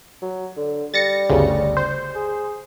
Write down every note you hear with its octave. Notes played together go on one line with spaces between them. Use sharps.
F#3
D3
G3 A6 A#6 C#7
G1 D2 C#3
C5
G#4